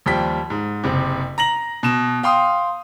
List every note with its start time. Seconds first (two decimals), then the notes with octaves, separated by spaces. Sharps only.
0.06 D#2 F3 G3 G5 B6
0.50 G#2
0.84 F#1 C3
1.38 A#5 A#6 F#7
1.83 B2 E7
2.23 F5 G5 C6 D#6